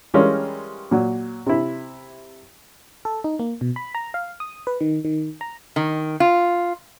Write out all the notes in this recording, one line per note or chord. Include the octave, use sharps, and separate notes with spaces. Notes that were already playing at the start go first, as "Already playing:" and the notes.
E3 G3 G#3 C#4 F4 A#4
A#2 F#3
C3 E4
A4
D#4
A#3
B2
B5
A#5
F5
D#6
B4
D#3
D#3
A#5
D#3
F4